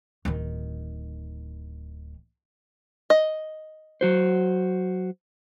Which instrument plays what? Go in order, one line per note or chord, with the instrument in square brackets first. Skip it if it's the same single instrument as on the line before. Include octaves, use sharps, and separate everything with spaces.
[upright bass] D1 D#3
[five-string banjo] D#5
[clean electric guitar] F#3 F#4 C5